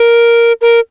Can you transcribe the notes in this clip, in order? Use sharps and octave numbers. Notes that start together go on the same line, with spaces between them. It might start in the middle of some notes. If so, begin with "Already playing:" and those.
Already playing: A#4
A#4